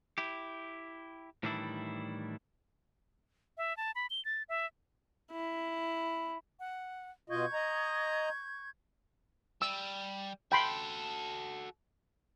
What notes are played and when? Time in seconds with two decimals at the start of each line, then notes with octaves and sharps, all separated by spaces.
0.18 E4 G4
1.43 A2 D#3 E3 G3 D4 E4
3.57 E5
3.77 A5
3.95 B5
4.10 G7
4.25 A6
4.49 E5
5.32 E4
6.60 F#5
7.30 B2 F4 D#5 C#6 G6 G#6
7.53 D#5 A#5
9.62 G3 E6
10.52 F#4 A4 G5 B5 C6